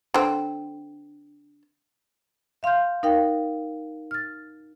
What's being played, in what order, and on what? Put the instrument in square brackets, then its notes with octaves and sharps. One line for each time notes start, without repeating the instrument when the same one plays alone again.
[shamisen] D3 C4
[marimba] E5 F5 C6 F6 G6
D#4 A#4 F5 G5
F6 A6